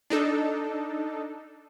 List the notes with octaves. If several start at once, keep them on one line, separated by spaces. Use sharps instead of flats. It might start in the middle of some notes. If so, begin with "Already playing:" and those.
D4 D#4 A4